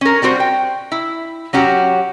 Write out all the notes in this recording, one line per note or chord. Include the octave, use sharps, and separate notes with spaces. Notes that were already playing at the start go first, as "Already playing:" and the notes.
C#4 A#4
G3 C4 F#4 C5
G5
E4
F#3 C#4 F#4 G4